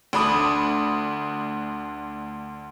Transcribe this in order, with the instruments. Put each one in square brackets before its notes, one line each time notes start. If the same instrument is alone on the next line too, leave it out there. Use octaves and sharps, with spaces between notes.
[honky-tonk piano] D2 D4 B5 D#6